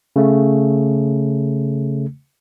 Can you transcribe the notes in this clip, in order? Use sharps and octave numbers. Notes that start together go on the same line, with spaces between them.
C#3 A3